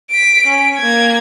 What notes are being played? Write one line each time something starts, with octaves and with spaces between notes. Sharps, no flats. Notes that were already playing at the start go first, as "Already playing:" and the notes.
B6 D7
C#4
A#3 G#6